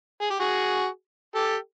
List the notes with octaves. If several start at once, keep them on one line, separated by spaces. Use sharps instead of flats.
G#4
G4
F#4 G#4
G4 A4